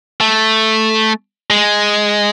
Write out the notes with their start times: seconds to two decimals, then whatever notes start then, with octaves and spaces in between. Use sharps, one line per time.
0.21 A3
1.50 G#3